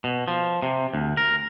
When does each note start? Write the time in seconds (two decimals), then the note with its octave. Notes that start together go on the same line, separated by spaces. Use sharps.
0.04 B2
0.28 F3
0.62 C3
0.93 D2
1.17 A#4